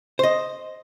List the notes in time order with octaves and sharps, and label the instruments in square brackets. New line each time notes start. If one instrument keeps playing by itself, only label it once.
[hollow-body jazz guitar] C5 D#5